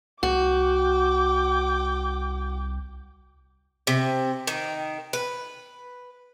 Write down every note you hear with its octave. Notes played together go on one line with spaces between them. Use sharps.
C2 F#4 G5 D6
C3
D#3
B4